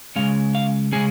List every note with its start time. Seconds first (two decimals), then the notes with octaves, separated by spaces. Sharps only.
0.16 C#3 G#3 C#4 F5
0.55 F5
0.92 C#3 G#3 C#4 G#4